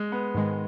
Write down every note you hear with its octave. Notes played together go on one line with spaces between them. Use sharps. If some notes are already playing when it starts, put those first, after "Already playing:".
Already playing: G#3
B3
G#2 D#3 G#3